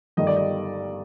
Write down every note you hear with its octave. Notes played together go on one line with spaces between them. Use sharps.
G1 G2 D#3 G3 D#5
D5
D#5